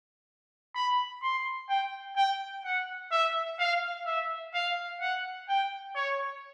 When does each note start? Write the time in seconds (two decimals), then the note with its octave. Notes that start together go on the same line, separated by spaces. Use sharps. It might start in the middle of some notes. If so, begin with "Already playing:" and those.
0.75 B5
1.22 C6
1.69 G5
2.16 G5
2.65 F#5
3.12 E5
3.59 F5
4.06 E5
4.54 F5
5.00 F#5
5.49 G5
5.95 C#5